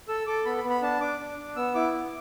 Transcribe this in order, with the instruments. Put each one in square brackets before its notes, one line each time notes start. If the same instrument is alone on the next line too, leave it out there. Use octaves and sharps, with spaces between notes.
[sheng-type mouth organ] A4 E6
A4 D6
B3 B5
B5
B3
B5
D4 A5
D4 D6
D4
D4
B3 E6
E4 D6
B3